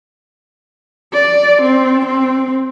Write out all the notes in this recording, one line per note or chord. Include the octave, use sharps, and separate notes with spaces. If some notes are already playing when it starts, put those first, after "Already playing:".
D5
C4
C4